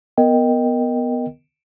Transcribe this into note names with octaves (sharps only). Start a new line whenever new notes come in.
B3 A#4 D#5 G5